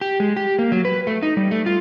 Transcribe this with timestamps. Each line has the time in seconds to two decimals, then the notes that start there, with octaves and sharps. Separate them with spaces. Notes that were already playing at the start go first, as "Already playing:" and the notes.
0.01 G4
0.20 G#3
0.37 G4
0.59 A#3
0.72 F#3
0.85 B4
1.07 A3
1.23 D#4
1.37 G3
1.51 A3
1.66 F4